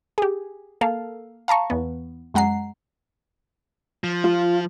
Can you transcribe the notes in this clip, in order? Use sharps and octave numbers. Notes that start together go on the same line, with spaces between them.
G4 G#4
A#3 A4 F5
F5 A5 A#5 C#6
E2 B3
F#2 G#3 F#5 A#5 C7
F3
F4